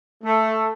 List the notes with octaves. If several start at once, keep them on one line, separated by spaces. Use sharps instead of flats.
A3